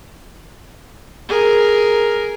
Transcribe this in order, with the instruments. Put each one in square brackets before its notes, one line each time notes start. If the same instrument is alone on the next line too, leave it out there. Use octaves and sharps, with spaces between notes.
[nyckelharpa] G#4 A#4